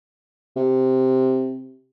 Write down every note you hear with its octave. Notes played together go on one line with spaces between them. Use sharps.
C3